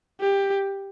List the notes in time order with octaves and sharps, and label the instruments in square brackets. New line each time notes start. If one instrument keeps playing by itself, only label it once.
[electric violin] G4